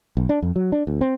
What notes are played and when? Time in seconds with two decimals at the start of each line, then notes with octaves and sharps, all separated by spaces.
0.17 B1
0.29 D4
0.42 F2
0.56 F#3
0.72 D4
0.87 D2
1.01 C4